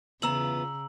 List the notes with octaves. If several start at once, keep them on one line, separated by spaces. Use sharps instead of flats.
E2 C#3 B3 F4 A#5 E6 F#7